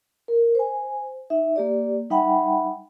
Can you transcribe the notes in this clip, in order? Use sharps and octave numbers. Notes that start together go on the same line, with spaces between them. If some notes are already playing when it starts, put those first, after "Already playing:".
A#4
C5 G#5
D#4 E5
A#3 G4 D5
G3 D#4 E5 F#5 G5 B5